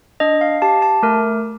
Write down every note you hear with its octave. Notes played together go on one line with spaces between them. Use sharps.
D4 D#5
F5
G4 A5
A5
A3 A#4